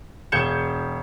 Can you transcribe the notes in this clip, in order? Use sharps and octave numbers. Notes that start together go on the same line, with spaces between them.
E1 G#4 G6 G#6 C#7 E7